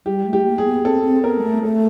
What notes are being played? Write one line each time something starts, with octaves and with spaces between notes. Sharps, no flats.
G3 G4
A3
G4
A#3
G#4
B3
C4 A4
C4
B3 A#4
G#3
A3
A3 A4